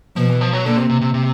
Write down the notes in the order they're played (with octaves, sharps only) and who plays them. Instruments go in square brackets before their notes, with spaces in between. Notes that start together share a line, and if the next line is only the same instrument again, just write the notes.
[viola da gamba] B2 [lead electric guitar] F3
[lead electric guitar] E3
F3
F#3
[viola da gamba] A#2 [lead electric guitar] D3
[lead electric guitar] C3
C3
C3
C3